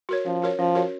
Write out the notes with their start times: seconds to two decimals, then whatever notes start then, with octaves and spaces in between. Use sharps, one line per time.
0.09 F#4 A#4 C#5
0.26 F3 C#4
0.42 F#4 A#4 C#5
0.59 F3 C#4
0.75 F#4 A#4 C#5